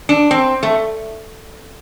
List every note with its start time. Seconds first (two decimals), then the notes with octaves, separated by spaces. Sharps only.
0.09 D4
0.31 C4
0.63 A3